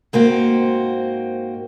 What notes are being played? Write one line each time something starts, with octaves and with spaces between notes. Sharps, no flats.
G#2 A#3 C4 F#4